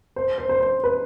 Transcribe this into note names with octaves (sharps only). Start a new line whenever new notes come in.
C5
C5
C5
C5
B4